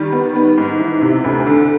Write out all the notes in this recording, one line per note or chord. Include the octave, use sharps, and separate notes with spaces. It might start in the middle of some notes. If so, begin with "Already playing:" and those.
Already playing: D#3 G3
B3
B3
G#2
E3
C3
D2
D3